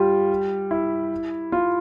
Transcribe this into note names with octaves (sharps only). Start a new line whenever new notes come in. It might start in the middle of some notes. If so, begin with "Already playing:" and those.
Already playing: G3 F4 G4
E4
F4